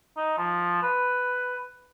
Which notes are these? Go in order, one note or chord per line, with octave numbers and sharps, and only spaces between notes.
D#4
F3
B4